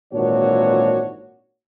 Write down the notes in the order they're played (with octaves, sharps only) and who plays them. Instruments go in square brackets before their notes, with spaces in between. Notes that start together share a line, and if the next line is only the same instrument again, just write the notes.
[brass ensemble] G#1 A#2 E3 D4 F#4 C#5